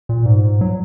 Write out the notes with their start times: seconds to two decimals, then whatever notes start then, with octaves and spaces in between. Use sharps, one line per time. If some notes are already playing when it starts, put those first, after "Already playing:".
0.09 A#2
0.26 G#2
0.61 F#3